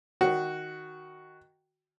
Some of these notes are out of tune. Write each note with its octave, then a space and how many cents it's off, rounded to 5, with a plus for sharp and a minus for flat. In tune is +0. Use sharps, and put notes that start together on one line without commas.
D#3 +0 F#4 +0